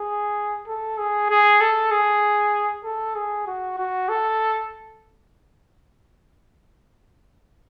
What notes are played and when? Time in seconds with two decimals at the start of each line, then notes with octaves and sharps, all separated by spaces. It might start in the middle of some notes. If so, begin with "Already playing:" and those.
Already playing: G#4
0.68 A4
0.98 G#4
1.30 G#4
1.61 A4
1.91 G#4
2.84 A4
3.15 G#4
3.47 F#4
3.78 F#4
4.09 A4